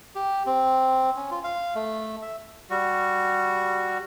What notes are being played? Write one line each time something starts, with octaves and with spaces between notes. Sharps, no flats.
G4
C4
C#4
F4
F5
A3
E5
G3 F#4